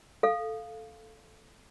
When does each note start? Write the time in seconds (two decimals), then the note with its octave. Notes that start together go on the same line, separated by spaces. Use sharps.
0.23 A4 F5